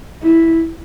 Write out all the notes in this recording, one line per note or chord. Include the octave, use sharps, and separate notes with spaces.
E4